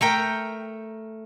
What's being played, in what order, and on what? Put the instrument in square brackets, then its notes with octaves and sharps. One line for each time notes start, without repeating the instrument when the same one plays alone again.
[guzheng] A3 A#4 G5